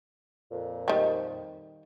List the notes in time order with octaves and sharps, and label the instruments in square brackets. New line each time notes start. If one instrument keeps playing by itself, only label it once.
[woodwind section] F2 A#2
[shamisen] D#3 G3